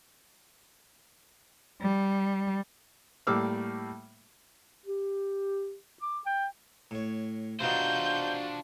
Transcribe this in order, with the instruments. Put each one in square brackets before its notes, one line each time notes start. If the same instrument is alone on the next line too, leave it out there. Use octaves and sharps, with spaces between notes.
[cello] G3
[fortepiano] A2 G3 A#3 D6 E6 F6
[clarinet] G4
D6
G5
[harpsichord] A2 C#5
[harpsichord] C3 B3 D#4 [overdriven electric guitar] D4 C5 [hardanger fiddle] F4 F#4 [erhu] G6